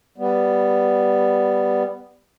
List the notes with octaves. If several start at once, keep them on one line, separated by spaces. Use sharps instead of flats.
G3 B3